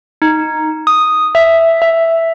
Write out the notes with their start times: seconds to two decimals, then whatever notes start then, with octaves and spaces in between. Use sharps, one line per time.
0.22 D#4
0.87 D#6
1.35 E5
1.82 E5